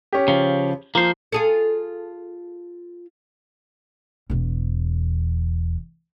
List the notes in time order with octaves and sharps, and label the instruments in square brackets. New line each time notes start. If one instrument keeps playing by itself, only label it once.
[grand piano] C#4 G4
[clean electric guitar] C#3 F3
[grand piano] F3 [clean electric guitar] A#3 C5
[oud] F4 G#4 A4
[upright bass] E1 E2